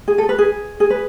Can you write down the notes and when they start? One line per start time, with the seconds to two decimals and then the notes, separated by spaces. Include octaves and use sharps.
0.08 G#4
0.18 A4
0.29 B4
0.38 G#4
0.80 G#4
0.90 B4